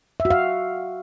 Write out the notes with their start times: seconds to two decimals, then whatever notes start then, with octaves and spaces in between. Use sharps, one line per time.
0.20 E5
0.25 F#4
0.30 F5